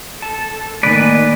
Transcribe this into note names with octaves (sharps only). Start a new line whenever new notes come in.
A4 A5
A2 D#3 A#3 B4 D5 G#5